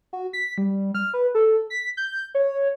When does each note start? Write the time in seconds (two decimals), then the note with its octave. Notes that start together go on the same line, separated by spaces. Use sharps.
0.13 F#4
0.33 B6
0.58 G3
0.95 F6
1.14 B4
1.35 A4
1.70 B6
1.97 G6
2.35 C#5